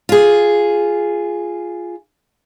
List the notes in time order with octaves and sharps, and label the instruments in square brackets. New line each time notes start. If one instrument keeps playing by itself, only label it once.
[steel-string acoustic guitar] F4 G#4